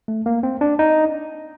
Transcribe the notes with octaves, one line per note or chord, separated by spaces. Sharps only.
A3
A#3
C4
D4
D#4